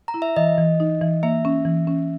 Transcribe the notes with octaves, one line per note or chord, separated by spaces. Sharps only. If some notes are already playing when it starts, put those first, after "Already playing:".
A#5
E4
E5
E3 D#5
E3
D#4
E3
A#3 E5
C#4
E3
C#4